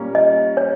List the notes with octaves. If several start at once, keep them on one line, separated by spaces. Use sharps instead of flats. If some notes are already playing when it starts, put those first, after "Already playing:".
Already playing: A#2 G3 A#3 C#4
D#5
C#5